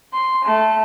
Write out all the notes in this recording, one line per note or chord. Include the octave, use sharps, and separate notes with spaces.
C6
A3